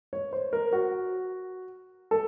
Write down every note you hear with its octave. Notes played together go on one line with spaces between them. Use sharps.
C#5
C5
A#4
F#4
A4